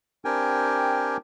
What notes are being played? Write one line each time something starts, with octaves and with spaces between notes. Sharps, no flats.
C4 D4 G4 A#4 G5 G#5